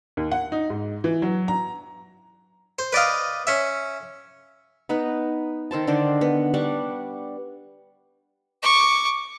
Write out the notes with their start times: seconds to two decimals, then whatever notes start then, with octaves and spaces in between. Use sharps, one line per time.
0.17 D#2
0.31 F#5
0.52 D#4
0.70 G#2
1.04 E3
1.22 F#3
1.48 A#5
2.79 C5
2.93 B4 D5 D#5 F5
3.47 C#4 E5
4.89 B3 D#4 B4
5.71 D#3 A4 C5 A5
5.87 D3 D#3 D4 C5
6.21 B3
6.54 G3 D4 F#5 C#6
8.63 C#6 D6